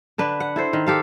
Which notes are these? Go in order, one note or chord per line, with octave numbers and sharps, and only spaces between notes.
D3 D4 B4
F#5
E4 A4 C5
D#3
G4 A4 F5